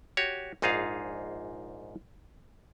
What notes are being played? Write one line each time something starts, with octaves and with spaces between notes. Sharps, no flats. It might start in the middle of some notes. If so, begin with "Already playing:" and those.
F#4 G4 C#5
A#1 G#2 D#4 F4 G#4 F5